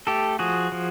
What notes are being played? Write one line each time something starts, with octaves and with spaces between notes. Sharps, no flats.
A3 G4 A4
F3 F#4 G#4
F3